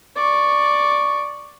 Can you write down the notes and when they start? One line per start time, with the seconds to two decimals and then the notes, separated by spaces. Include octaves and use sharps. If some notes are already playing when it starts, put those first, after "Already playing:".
0.16 D5 C#6